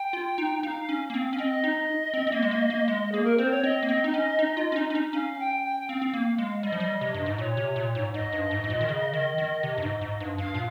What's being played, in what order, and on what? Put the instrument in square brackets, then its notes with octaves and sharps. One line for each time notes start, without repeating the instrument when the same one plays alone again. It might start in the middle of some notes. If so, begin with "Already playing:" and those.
Already playing: [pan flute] G5
[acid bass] F4
D#4
[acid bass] D#4 [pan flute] F5
[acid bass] C#4
A#3
C4
C#4
[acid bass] C4 [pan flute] D#5
[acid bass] D#4
C4
C4
A#3
G#3
A#3
A#3
G#3
[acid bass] A#3 [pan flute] G#4
[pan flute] A#4
[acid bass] C4 [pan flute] C5
[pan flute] C#5
[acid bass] C4 [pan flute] D#5
[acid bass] A#3
C4
D#4
C#4
D#4
F4
C#4
D#4
C#4
D#4
[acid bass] C#4 [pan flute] F5
[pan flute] G5
G5
[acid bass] C4 [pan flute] F5
[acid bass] C4
A#3
G#3
[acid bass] G3 [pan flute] D#5
[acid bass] F3
G3
C3
G2
G#2
[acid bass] A#2 [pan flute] C#5
[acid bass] C3
A#2
G#2
[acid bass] G#2 [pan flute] D#5
[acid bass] G2
G#2
G#2
A#2
D#3
C#3
D#3
D#3
C3
G2
G#2
G#2
G2
[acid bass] G2 [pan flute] F5
[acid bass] A#2